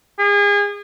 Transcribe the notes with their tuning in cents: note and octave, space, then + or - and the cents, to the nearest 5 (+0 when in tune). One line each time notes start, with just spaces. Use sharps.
G#4 -35